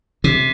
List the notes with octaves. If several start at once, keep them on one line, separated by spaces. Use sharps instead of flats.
C3